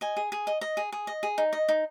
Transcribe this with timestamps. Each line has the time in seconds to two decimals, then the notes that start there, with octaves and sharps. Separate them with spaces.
0.01 D#5 G#5
0.17 G#4
0.32 G#4
0.47 D#5
0.61 D#5
0.77 G#4
0.92 G#4
1.07 D#5
1.23 G#4
1.38 D#4
1.53 D#5
1.69 D#4